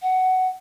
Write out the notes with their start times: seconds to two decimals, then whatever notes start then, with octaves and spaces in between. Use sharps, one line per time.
0.02 F#5